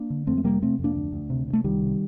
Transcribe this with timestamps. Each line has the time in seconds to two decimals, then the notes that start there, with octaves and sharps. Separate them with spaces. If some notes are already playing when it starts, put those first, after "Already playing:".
Already playing: A#3 D4
0.10 D3
0.27 F2 A3 C4
0.37 A3
0.44 C3 G3 A#3
0.62 C3 A3 C4
0.79 F2
0.84 A#3 D4
0.96 D2
1.13 D2
1.30 C3
1.47 C3
1.53 A3
1.64 C2 D#3 G3
1.82 C3